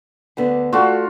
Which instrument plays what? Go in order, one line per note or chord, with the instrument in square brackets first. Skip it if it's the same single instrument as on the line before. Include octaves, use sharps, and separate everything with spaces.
[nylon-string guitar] D2 D3 B3
[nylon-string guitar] A3 D4 A4 [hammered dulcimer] F4 F#4